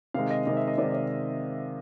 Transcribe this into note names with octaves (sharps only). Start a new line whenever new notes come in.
C3 D#3 G#3 F5
D#5
C3 D#3 G#3 D#5
E5
D#5
C3 D#3 G#3 D5
D5